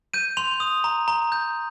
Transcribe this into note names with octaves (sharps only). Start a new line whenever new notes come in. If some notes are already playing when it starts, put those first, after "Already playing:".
G6 D#7
C6 F7
D#6
A#5
A#5
G6